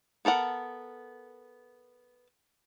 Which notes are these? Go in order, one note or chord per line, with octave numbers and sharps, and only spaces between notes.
B3 A4 A#4 F#5